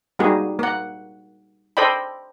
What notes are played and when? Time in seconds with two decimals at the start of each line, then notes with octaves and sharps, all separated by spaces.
0.19 G3 A#3 D#4 F#4 G#4
0.59 A#3 F#5
1.77 A4 C5 D5 D#5 G5 B5